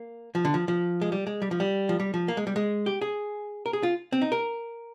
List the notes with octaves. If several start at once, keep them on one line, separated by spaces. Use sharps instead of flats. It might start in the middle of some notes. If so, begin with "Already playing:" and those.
Already playing: A#3
F3
D3
F3
F3
G#3
G3
G#3
G3
F3
G3
F3
G3
F3
A#3
G#3
G3
G#3
G4
G#4
A#4
G#4
F4
C4
D#4
A#4